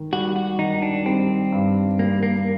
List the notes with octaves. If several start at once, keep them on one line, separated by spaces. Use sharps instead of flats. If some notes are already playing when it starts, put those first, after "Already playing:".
Already playing: D#3
G3 F#4
F#4
D#3 D#4
D4
G3 C4
G2
G3 A#3
A#3